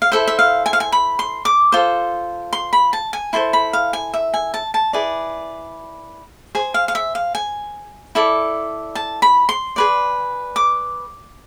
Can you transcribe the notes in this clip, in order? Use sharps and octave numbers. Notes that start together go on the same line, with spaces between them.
F5
E4 A4 C5 E5
E5
F5
G#5
F5
G#5
B5
C6
D6
F4 A4 C5
C6
B5
A5
G#5
E4 A4 C5 C6
B5
F5
G#5
E5
G#5
A5
A5
E4 G#4 B4 D5
G#4 C5 G#5
F5
F5
E5
F5
G#5
E4 A4 D5
A5
B5
C6
G#4 B4 D5
D6